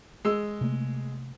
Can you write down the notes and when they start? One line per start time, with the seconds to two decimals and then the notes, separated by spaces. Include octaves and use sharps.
0.25 G#3 E6
0.61 C3 A3 A#3